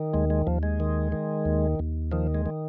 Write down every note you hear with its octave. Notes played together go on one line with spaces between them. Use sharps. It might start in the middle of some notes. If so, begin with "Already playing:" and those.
Already playing: D#3
D#2 G#3
G#3
D#2 F3
G#3
D#3
D#3
D#2
D#2
D#3 F3
G#3
D#3